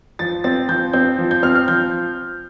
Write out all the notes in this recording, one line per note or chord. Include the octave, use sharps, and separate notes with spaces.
F3 A6
C4 A6
F3 G6
C4 G6
F3
G6
C4 F6
F6
F3 G6